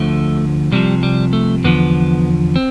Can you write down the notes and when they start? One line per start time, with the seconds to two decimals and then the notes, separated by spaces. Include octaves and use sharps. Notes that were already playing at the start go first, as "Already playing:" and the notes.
Already playing: D2 D3 F3 A3
0.72 C2 C3 F3 G3
1.03 G3
1.33 A3
1.64 E2 D3 F3 B3
2.56 C4